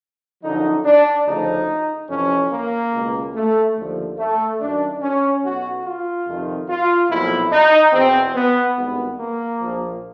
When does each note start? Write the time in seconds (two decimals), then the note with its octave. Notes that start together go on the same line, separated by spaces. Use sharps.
0.42 F#2 D3 F3 D#4
0.85 D4
1.27 D2 C#3 F3 D#4
2.10 F2 C3 E3 C#4
2.52 A#3
2.93 C#2 B2
3.35 A3
3.76 D#2 D3 F3
4.18 A3
4.61 F#2 D#3 D4
5.02 C#4
5.44 B1 B2 F#4
5.85 F4
6.27 F2 C3 D#3
6.69 F4
7.10 B1 A#2 F3 E4
7.52 D#4
7.93 E2 B2 C4
8.35 B3
8.78 G#1 G2 D#3 B3
9.19 A#3
9.60 A#1 A#2 F3